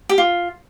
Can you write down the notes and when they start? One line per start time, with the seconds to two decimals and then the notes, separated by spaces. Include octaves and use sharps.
0.09 G4
0.18 F4